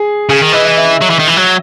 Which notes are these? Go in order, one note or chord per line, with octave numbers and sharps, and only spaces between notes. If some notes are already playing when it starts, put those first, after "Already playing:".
Already playing: G#4
C#3 G#4
D#3
E3 D#5
D#5
E5
F#3
E3
D#3
E3
F#3